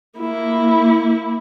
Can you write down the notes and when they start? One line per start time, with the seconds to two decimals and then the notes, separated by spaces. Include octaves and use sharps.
0.19 A#3 E4